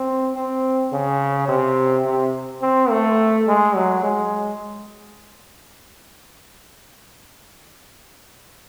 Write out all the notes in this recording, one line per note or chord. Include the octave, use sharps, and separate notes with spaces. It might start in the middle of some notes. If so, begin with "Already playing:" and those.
Already playing: C4
C4
C#3
C3
C3
C4
A3
G#3
F#3
G#3